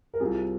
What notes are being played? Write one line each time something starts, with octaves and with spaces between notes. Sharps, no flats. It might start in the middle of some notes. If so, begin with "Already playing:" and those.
A#4
C2 C3 G3 C4 F4 G#4